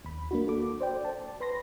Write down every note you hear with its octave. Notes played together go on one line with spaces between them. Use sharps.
D#2 B5
A#3 D4 F#4
F#4 A4 D6
C5 D5 G5
A5
B4 B5 C6 A#6